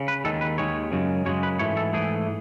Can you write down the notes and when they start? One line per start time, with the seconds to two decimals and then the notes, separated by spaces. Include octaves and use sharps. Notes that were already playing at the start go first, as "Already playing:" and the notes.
Already playing: C#3
0.08 B4
0.24 D#2 D#3 G#3 A4
0.41 B4
0.58 D#2 D#3 G#3 C#5
0.92 F#2 C#3 G#3
1.26 F#2 C#3 G#3 C#5
1.43 B4
1.59 G#2 E3 A3 C#5
1.77 A4
1.93 G#2 E3 A3 G#4